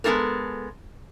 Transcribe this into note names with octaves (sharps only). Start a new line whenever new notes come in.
G#3 B3 C#4 F4 A4 A#4